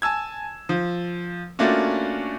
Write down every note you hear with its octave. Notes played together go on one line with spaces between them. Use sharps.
G#5 A5 E6 G#6
F3
A3 A#3 C#4 D4 F4 F#4